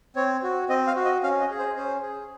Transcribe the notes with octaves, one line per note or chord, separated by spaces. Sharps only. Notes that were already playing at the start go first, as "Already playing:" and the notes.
C4 C#5
F#4
C4 D#5
F5
F#4
D#5
C#4 F5
D#5
G#4
C5
C#4 C5
G#4